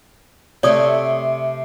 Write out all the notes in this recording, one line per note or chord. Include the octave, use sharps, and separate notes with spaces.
C3 A3 C4 C#5 D5 D#6